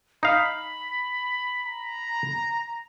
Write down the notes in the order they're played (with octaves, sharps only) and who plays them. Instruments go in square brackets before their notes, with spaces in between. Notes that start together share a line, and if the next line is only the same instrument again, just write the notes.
[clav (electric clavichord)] D#4 F5 [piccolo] B5
[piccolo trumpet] A#5